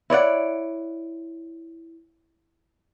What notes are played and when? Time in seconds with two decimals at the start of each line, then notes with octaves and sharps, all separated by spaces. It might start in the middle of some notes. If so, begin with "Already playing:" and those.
0.10 E4 C#5 D5 F#5